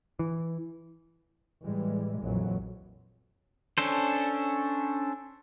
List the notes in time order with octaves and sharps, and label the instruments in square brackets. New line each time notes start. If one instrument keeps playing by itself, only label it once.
[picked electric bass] E3
[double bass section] A2 E3 G3 G#3
A#1 F2 E3 F#3
[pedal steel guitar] C#4 D4 A4 C5